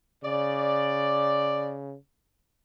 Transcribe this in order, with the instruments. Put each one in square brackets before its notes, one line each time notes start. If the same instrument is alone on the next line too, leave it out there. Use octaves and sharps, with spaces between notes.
[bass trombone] C#3 [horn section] D5